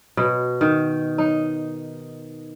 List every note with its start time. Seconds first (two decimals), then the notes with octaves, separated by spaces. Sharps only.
0.17 B2
0.61 D#3
1.18 D#4